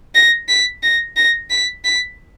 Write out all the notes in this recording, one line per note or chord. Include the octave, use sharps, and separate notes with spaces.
A#6
B6
A#6
A#6
B6
B6